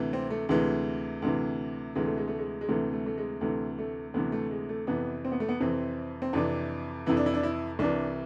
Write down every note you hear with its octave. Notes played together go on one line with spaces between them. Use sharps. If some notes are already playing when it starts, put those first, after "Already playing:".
Already playing: D2 C3 E3
C4
A3
D2 C3 E3 G#3
D2 C3 E3
D2 C3 E3 G#3
A3
G#3
A3
G#3
G#3
D2 C3 E3 A3
A3
A3
G#3
D2 C3 E3 A3
A3
D2 C3 E3 B3
A3
G#3
A3
F2 C3 E3 B3
C4
B3
A3
B3
F2 C3 E3 C4
C4
F2 C3 E3 D4
F2 C3 E3 E4
D4
E4
D4
E4
C2 C3 E3 D4